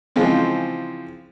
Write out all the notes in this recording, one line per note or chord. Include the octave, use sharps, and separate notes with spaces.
C#3 E3 F3 G#3 C4